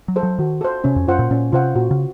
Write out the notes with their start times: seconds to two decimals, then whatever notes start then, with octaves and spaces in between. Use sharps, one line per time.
0.08 F#3
0.16 A4 C5
0.23 F#3
0.39 D#3 F#4
0.61 A4 C5
0.84 C3 C#4
0.96 F2
1.08 F#2 F4 C5 F#5
1.19 A#2
1.31 A#2 C#4
1.52 C3 F4 C5 F#5
1.76 A#2 F#4
1.91 C#3